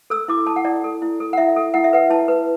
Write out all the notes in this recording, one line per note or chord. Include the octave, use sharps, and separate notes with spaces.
A4 E6
E4 D6
A4 A5
F#5
E4 D5
A4
E4
A4
F#5
E4 E5
A4
E4 F#5
E5
B4 F#5
E4 A5
B4